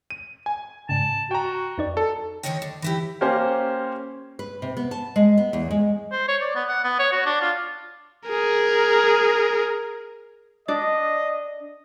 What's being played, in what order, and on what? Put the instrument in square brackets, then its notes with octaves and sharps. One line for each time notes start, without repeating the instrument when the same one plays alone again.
[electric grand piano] D#7
G#5
[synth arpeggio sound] G#2 C#3 [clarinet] A5
[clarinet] F#4 [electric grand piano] G5 A#5
[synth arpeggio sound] F2 D#4 D5
[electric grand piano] A4
[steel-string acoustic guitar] D3 D#3 D4 C#5 D#5 G5
D4
E3 E4 G4
[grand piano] A#3 C#4 G4 C5
[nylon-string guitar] B4
C3
B3
A5
G#3
B3
E2
G#3
[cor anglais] C5
C#5
D5
B3
F#5
B3
C#5
F#4
D4
F4
[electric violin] G#4 A#4
[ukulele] D4 D5 [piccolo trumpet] D#5